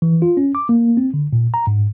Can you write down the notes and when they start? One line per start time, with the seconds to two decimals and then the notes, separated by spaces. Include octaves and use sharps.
0.02 E3
0.22 F4
0.37 C#4
0.55 D6
0.69 A#3
0.97 C4
1.14 D3
1.33 A#2
1.54 A#5
1.67 G#2